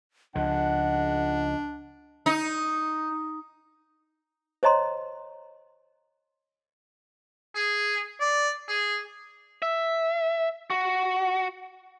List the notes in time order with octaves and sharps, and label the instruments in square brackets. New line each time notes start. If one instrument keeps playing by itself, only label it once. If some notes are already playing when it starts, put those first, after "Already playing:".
[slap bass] C#2 F3 [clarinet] D4 [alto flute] D#5 [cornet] F#5
[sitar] D#4
[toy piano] C5 C#5 D#5 A#5 C6
[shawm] G#4
D5
G#4
[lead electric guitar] E5
F#4